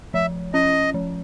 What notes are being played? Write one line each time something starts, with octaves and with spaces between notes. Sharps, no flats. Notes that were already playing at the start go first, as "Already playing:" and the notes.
F3 E5
C#4 D#5
F3